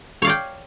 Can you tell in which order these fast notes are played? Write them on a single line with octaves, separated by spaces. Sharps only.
C#5 F5 D5 G5